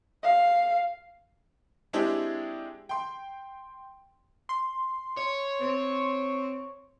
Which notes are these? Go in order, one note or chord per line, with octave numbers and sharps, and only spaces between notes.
F5
G#3 C4 D4 E4 G4 G#4
G5 C6
C6
C#5
C4